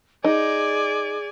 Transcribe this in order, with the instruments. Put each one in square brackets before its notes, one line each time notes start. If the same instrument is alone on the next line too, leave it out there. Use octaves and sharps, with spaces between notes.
[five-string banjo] D#4 [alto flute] G#4 [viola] D5 G#5